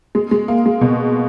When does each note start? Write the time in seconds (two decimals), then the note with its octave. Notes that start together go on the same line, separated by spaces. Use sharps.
0.15 G#3
0.31 G#3
0.48 A#3
0.66 G#3
0.81 B2